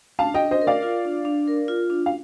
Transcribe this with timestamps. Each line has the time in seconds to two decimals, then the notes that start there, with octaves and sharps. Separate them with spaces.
0.19 D4 F5 A5
0.34 D#5 G5
0.40 D4
0.51 C5 D#5
0.62 A#4
0.67 D5 F5
0.83 F4
1.05 D4
1.25 D4
1.47 A#4
1.68 F4
1.90 D4
2.06 F5